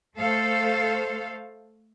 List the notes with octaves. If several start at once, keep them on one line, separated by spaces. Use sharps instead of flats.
A3 A4 C5 F5